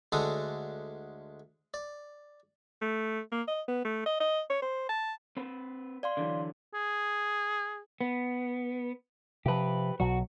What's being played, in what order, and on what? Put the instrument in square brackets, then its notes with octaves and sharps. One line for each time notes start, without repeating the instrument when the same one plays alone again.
[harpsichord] D2 D3 G#3 D4 A4 D#6
D5
[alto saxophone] A3
A#3
D#5
B3
A3
D#5
D#5
C#5
C5
A5
[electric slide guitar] C4 B4
[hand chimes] D5 F5 C6
[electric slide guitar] D3 E3 F#3
[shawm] G#4
[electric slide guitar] B3
[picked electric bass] C3 F3 [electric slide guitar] G4 B4
[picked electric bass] B1 B2 F#3 [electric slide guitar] F#4